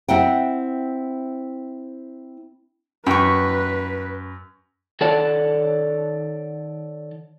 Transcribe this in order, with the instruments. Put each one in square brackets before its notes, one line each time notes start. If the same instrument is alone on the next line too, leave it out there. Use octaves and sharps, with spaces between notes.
[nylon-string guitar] C4 E4 F#5 G5
[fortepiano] F#2 [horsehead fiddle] B4 [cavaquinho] G5 C#6
[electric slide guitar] D#3 A4 C#5 D5 F#5 A5